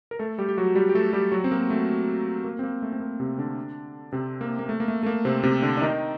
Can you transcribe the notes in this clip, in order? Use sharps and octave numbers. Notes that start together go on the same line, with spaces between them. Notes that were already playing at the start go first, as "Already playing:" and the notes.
A#4
A3 A4
G3 G4
G4
F#3 F#4
G3 G4
G4
A3 A4
G3 G4
F#3 F#4
C4
A#3
A3
A#3
C4
A#3
A3
C4
A#3
C3 C4
D3 D4
C3 C4
A#3
A#3
A3
A#3
A3
A3
A#3
C3 C4
C3 C4
D3 D4
D4
D#3 D#4